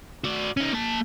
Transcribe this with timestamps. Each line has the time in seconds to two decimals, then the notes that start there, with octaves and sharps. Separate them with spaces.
0.24 F#4 D5
0.57 C#4 D#4
0.73 A#3 A5